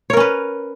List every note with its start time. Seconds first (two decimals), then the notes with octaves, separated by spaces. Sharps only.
0.10 C#5
0.13 A#4
0.17 C#4
0.20 B4